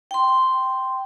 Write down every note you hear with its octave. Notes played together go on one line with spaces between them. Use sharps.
G5 C6